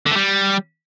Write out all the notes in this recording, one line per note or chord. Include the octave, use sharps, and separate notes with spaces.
D3
A3
G3